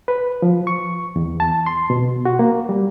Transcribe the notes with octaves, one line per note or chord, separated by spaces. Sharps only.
B4
F3
C#6
E2
A5
C6
B2
F#4
A#3
G3